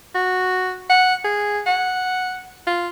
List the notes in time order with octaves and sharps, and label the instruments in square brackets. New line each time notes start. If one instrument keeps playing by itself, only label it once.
[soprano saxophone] F#4
F#5
G#4
F#5
F4